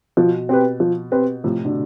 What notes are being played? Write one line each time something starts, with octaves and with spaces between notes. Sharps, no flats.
B2 F3
C4 G4 B4
F3
C4 G4 B4
A2 C3 F3
B2 D3